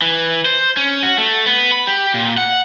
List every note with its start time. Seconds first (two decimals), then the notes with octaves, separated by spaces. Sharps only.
0.02 E3
0.46 C5
0.77 C#4
1.03 F#4
1.18 A3
1.46 B3
1.71 B5
1.87 G4
2.14 A#2
2.38 F#5